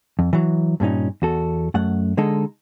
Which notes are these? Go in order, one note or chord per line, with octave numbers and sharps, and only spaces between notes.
F2
E3 F#3
G2 A#2 C#4 D#4
E2 F#4 A4
F#2 A3 F#5
D3 G#3 D#4 A4